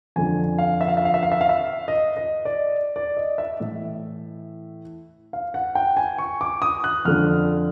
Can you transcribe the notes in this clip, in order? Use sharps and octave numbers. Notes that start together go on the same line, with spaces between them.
F2 D3 G#5
F5
E5
F5
E5
F5
E5
F5
E5
F5
E5
D#5
D#5
D5
D5
D#5
E5
A2 E3 E5
F5
F#5
G5
G#5
C#6
D6
D#6
F#6
F2 D3 F6